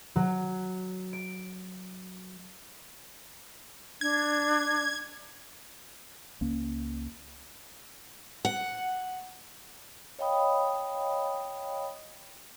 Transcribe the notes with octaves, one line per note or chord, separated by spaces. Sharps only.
F#3
D7
D4 G#6
C#2 A#3 C#4
F#5
C#5 D#5 F5 G5 B5 D#6